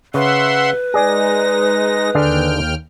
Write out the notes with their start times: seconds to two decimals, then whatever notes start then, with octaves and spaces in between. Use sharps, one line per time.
0.14 C#3 B4 E5 F#5 C6
0.94 G#3 D#4 G#4 D5 G#5 A#6
2.15 D#2 D3 D4 G#4 G5 F6